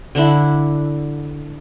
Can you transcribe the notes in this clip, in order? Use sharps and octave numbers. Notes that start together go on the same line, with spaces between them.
D3 D4 E4